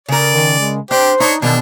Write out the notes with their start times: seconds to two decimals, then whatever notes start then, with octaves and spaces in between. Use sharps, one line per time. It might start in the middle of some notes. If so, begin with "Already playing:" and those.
0.09 C#3 A#4 D5
0.32 D#3
0.60 G#3
0.91 D4 G4 C5
1.20 D4 D#4 C#5
1.42 E2 B2 D#3 D4